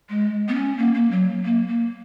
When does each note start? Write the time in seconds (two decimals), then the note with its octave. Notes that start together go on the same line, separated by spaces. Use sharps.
0.10 G#3
0.48 B3
0.54 C#4
0.78 A#3
0.94 A#3
1.11 F#3
1.45 A#3
1.68 A#3